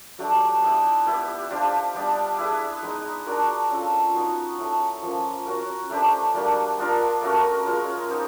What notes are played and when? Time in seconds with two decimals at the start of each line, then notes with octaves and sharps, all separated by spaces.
0.18 F#3 A3 D4 G4
0.63 B3 E4 G4
1.06 B3 E4 G4 B4
1.50 D4 G4 C5 F5
1.94 G3 B3 D4
2.38 E4 G#4 B4
2.82 G#3 B3 D#4
3.26 D4 F#4 A#4
3.70 C#4 F4 A4
4.14 B3 D#4 F#4
4.58 C#4 E4 A4
5.02 F3 A#3 C#4
5.46 C#4 F#4 A#4
5.90 A3 D4 G4 C5
6.34 G3 A#3 D4 F#4
6.78 B3 D4 F4 A#4
7.22 A3 C#4 F#4 A#4
7.66 G#3 C#4 F4 A#4
8.10 B3 D#4 G4 C5